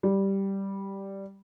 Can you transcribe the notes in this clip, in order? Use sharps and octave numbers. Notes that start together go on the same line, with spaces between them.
G3